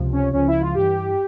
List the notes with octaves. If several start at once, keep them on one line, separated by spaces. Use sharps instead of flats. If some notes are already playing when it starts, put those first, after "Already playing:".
Already playing: C#2 C3 F3
C#4
C#2 C#3 F3 C#4
E4
F4
G2 E3 G4